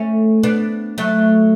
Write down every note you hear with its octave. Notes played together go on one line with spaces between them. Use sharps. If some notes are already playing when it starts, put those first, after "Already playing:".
Already playing: A3 C#4
B3 D4
F#3 A3